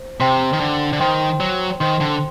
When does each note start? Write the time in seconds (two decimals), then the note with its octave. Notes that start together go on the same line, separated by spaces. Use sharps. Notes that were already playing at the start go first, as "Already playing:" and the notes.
Already playing: C5
0.20 C3 C5 G5 C6
0.53 D#3
0.60 D3
0.93 D3
1.00 D#3 C5 G5 C6
1.40 F#3
1.80 D#3 C5 G5 C6
2.01 D3